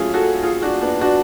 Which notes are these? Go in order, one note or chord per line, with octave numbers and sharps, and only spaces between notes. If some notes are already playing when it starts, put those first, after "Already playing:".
Already playing: F#3 A3 C#4 F4 G#4
F#4 A4
F4 G#4
D4 F#4
B3 D4
D4 F#4